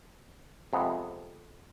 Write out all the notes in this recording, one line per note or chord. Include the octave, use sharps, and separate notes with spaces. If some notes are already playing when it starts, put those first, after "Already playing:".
F2 C3 G#3 B3